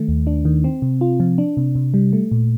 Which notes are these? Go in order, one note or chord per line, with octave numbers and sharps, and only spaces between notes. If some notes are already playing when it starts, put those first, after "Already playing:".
Already playing: D#3 A3
D#2
D4
D#3
C4
C3
F4
F3
D4
C3
C3
G3
A3
A#2